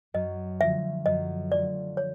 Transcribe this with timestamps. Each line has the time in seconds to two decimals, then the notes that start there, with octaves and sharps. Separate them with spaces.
0.14 F#2 D#5
0.61 D3 F3 A3 E5
1.06 F#2 D#5
1.52 D3 F3 A3 D5
1.97 C#5